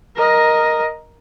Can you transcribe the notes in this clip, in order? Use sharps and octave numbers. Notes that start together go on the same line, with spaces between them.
A#4 D#5